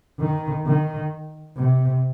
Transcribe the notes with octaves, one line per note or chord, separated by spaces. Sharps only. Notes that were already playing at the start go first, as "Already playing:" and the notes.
D#3
D#3
C3